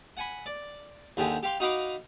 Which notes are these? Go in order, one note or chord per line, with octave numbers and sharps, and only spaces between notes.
F#5 G#5 B5
D5
D#2 D3 G4 G#4
G4 F5 C6
D#4 F#4 D#5 F5 B5 D6